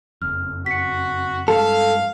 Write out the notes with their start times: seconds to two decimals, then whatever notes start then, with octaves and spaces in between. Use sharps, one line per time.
0.22 F#1 F2 F6
0.66 F#4 B6 C#7
1.48 G2 F3 G#3 A4 F5